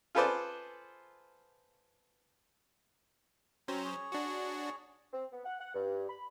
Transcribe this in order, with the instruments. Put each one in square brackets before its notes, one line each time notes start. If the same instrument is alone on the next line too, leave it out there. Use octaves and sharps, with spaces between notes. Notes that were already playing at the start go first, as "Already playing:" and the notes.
[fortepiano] F4 G#4 A4 B4 C5 D5
[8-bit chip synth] F#3 C#4 C5 [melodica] C4 A#5
[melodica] G#4 C#5
[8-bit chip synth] D4 F#4
[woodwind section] C4
B3
F#5
F#5
G2
B5